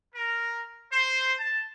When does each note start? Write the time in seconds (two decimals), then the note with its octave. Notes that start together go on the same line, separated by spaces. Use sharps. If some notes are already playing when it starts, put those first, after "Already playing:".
0.15 A#4
0.90 C5
1.40 A5